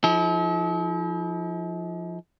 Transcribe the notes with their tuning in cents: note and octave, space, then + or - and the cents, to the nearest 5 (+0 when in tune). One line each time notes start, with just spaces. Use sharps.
F3 +0 D#4 +45 A4 -45